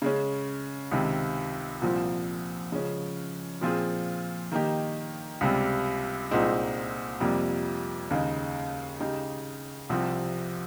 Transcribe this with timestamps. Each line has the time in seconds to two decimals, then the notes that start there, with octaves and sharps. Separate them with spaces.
0.02 C#3 G#3 C#4
0.92 C#2 C3 D#3
1.82 C2 A#2 F3 C4
2.72 C#3 F3 G#3 C#4
3.61 A#2 F3 C4 F4 G#4
4.52 D#3 A#3 D#4 G4
5.41 C#2 C3 G3
6.31 C2 A#2 G#3 C4 D#4
7.20 F2 C3 G3 A#3
8.10 D#2 C#3 G#3 D#4
9.00 C#3 G#3 D#4 G4
9.89 C2 C3 F3 C4